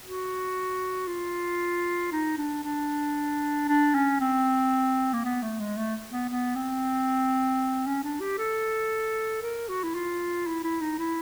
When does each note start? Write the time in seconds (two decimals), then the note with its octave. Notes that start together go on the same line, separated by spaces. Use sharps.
0.03 F#4
1.07 F4
2.12 D#4
2.37 D4
2.63 D4
3.68 D4
3.94 C#4
4.20 C4
5.13 A#3
5.25 B3
5.42 A3
5.60 G#3
5.77 A3
6.12 B3
6.29 B3
6.56 C4
7.86 C#4
8.04 D4
8.21 G4
8.38 A4
9.42 A#4
9.69 F#4
9.84 E4
9.95 F4
10.47 E4
10.64 E4
10.81 D#4
10.99 E4